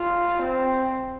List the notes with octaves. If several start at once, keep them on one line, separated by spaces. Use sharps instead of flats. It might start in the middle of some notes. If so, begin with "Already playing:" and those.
Already playing: F4
C4